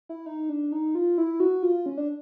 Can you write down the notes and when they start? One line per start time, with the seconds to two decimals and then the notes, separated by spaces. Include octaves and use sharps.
0.09 E4
0.26 D#4
0.49 D4
0.72 D#4
0.95 F4
1.18 E4
1.40 F#4
1.63 F4
1.86 C#4
1.97 D4